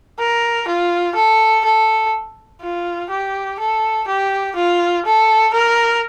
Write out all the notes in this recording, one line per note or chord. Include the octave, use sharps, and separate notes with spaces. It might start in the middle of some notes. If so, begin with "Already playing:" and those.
A#4
F4
A4
A4
F4
G4
A4
G4
F4
A4
A#4